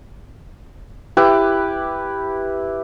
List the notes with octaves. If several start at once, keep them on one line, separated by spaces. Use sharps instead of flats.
E4 G4 B4 D6